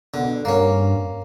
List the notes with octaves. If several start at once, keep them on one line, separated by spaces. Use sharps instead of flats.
B2 D3
G2 A#3 C#4